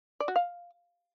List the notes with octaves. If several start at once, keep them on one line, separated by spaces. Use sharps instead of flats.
D5
F#4
F5